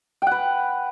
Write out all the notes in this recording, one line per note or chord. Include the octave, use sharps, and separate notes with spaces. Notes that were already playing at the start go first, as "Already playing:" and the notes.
B4 F#5 G5